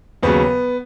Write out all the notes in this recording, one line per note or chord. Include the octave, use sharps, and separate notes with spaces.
D#2 C#3 F#3 B3